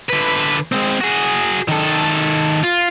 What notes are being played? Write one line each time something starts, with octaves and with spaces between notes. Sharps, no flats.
D3 B4
G#3 C4
F#4 G#4
D#3 A4
F4